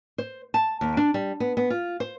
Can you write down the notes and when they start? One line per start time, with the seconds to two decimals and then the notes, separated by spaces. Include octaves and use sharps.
0.18 C5
0.54 A5
0.81 D#2
0.97 D4
1.14 G3
1.40 B3
1.57 B3
1.70 F4
2.00 C5